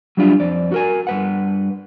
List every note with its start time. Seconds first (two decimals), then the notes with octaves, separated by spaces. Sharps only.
0.17 F#3 G3 D4 E4 F4
0.40 F2 D5
0.72 F#4 A#4 G#5
1.07 G2 B4 F#5